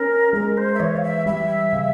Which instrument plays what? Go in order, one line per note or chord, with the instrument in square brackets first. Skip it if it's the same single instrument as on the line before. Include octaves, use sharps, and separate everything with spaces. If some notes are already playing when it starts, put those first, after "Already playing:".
Already playing: [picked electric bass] C#4 [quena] A#4
[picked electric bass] G#3 [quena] A#4
[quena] C5
E5
[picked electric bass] E3 [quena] C#5
[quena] F5
E5
[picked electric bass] G3 [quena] E5
[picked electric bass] C#3